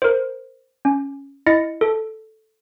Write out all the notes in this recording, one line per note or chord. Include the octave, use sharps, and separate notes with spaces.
A#4 C5
C#4
E4 D#5 A6 A#6 C#7
A4